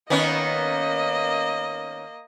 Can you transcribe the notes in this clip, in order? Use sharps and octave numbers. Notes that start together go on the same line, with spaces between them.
D#3 A#3 B3 C#4 D#5